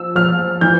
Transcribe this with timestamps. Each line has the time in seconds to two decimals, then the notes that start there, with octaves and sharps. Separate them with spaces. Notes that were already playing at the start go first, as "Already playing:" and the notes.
Already playing: F3 E6
0.15 F3 F6
0.61 E3 G6